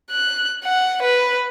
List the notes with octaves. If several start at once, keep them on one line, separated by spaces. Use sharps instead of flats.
F#6
F#5
B4